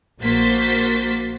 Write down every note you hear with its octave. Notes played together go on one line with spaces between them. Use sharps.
A#1 A#3 F#4 C5 A6 B6